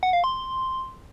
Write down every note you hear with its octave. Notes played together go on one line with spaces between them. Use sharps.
F#5
F5
C6